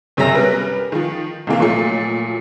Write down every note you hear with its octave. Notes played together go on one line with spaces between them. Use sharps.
F#1 C3 F#3 E5 A#5 A#6
G3 B3 C#4 A#4 B4
D#3 F3
B1 C3 E3 A#3
A#2 F3 F#3 A3